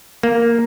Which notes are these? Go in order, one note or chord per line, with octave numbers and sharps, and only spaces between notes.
A#3